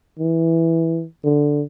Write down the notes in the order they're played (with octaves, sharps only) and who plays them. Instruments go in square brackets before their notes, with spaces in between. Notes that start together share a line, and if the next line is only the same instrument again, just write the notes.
[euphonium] E3
D3